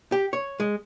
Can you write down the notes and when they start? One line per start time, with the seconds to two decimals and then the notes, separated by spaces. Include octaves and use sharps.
0.12 G4
0.33 C#5
0.60 G#3